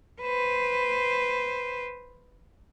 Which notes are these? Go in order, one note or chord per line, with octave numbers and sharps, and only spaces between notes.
B4 C5